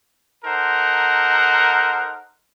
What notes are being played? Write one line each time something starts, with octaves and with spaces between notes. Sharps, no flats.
D#4 A4 A#4 C5 F#5